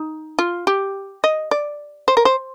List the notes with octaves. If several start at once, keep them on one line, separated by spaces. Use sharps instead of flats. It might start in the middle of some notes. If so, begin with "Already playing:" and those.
Already playing: D#4
F4
G4
D#5
D5
C5
A#4
C5